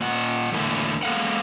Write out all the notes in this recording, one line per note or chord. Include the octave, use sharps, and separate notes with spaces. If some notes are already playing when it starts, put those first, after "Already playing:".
A#2 F#5
E2 A2 D3 A#3 E4
G#3 A#3 A4 F5 F#5